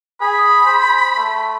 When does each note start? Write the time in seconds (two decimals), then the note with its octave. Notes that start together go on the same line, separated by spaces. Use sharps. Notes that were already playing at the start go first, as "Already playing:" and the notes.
0.21 G#4 B5
0.65 C5
1.16 A3